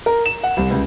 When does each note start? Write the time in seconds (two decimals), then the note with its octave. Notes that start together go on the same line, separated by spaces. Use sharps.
0.06 A#4
0.26 E7
0.43 F#5
0.57 C2
0.70 C#2